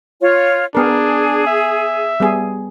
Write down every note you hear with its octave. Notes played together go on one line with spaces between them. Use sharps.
F4 C#5
B3 D4 G#4 A#4
E5
G3 B3 G#4